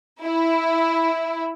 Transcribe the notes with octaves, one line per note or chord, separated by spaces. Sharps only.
E4